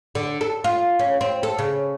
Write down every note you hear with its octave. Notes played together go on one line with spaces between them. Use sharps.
D3
A4
F4
C#4
C4
A4
C#3